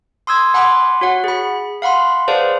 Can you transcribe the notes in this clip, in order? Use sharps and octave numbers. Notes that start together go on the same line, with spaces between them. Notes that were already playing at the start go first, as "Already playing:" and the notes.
C6 D#6 E6 G#6
F#5 G#5 B5 C6 D6
F#4 C#5 F#5
G#4 B5
F5 F#5 B5 C6
G#4 B4 C5 D5 F5 A5